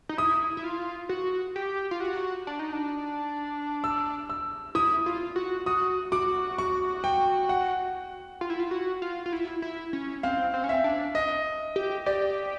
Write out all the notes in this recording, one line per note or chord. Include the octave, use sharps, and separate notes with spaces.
D#4
E4 D#6
E4
F4
F#4
G4
F4
F#4
D4
D#4
D4
E6
E6
E4 D#6
F4
F#4
F#4 D#6
F#4 D6
C#6
G5
F#5
F4
E4
F4
F#4
F4
F4
E4
E4
C#4
C4 F5
C4
C#4
C4 E5
D4
D#5
G4
G4 D5